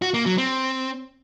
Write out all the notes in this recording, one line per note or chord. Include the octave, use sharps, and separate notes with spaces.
F#4
A#3
F#3
C4